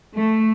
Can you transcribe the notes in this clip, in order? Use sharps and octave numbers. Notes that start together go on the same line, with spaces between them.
A3